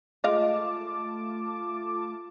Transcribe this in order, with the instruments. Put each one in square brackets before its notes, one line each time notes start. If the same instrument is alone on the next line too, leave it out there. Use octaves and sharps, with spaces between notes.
[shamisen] G#3 D#5 F5 [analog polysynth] A3 F4 A5 [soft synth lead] D6